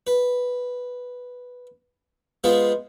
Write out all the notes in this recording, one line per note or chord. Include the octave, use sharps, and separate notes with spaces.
B4
G#3 B3 F4 G#4 B4 C5